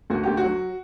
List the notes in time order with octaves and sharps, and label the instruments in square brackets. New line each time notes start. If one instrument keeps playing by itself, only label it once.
[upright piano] D2 F#4
D2 G4
F#4
F#3